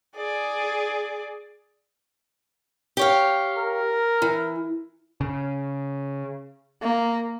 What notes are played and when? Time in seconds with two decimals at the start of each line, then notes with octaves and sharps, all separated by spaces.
0.16 G#4 D5
2.97 G4 C#5 F5
3.58 A#4
4.22 E3
5.21 C#3
6.82 A#3